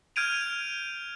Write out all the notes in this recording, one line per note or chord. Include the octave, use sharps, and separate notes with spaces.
F6 G6 G#6 D7 D#7 F7